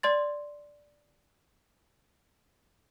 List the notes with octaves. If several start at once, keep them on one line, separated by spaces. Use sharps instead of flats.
D5 C6 A6